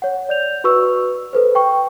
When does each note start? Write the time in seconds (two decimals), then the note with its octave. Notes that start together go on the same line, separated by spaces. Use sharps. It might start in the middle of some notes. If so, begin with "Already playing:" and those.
0.02 C#5 F#5
0.29 D5 G6 F7
0.64 F#4 B4 C#6 E6
1.33 A4 B4 C5
1.55 G5 C#6